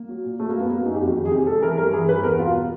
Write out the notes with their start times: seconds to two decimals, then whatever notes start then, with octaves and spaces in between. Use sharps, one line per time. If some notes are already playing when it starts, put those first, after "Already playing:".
Already playing: A#3
0.09 F#3
0.24 A#2
0.40 F#3 A3
0.49 A#3
0.55 F#2
0.60 B3
0.70 F#3 A#3
0.85 F#2 D#4
0.94 G4
1.01 F2 F#4
1.17 D#3 G4
1.25 G#4
1.31 C3 G4
1.47 G#3 A4
1.62 E3 A#4
1.78 G2 A#4
1.93 E3 G#4
2.09 G2 B4
2.23 E2 A#4
2.39 B2 F4